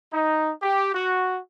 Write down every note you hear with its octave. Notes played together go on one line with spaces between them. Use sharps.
D#4
G4
F#4